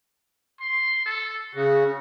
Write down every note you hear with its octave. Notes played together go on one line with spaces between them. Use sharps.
C6
A4
C#3 F#4